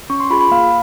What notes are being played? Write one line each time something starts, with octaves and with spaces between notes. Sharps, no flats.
C#4 C#6
C6
F4 G#4 B5
B5
A#3 F5